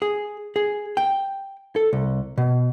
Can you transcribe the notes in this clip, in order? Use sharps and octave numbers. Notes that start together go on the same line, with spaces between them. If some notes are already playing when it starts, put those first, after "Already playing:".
G#4
G#4
G5
A4
C2
B2